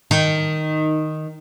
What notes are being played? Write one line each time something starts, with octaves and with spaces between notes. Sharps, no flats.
D#3